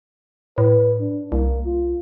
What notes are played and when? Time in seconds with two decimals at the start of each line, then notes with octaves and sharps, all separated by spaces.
0.58 A2 B4
1.00 D4
1.32 C2 A#3
1.66 F4